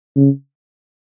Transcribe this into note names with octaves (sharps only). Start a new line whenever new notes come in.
C#3